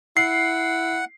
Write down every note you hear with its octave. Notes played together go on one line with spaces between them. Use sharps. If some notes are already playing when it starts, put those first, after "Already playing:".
E4 F#5 C7